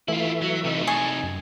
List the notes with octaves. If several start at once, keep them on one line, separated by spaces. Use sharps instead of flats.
E3 A3 E4 F4 E5
F#3
C3 D#4
G#4 A5 C#6
F#2